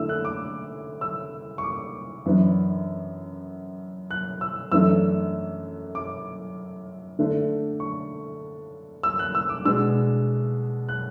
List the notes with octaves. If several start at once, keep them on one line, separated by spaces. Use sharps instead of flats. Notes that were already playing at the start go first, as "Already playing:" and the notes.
Already playing: D3 A3 E4 E6
F#6
D6
E6
C#6
D6
F#2 E3 B3 D4
F#6
E6
F#2 E3 A3 D4 E6
D6
D3 A3 D4
C#6
E6
F#6
E6
D6
B2 G#3 D4 E6
F#6